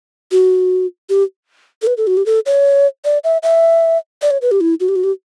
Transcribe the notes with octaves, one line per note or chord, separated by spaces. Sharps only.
F#4
G4
A4
B4
A4
F#4
G4
A4
C#5
D5
E5
E5
D5
C#5
B4
G4
E4
F#4
G4
F#4
G4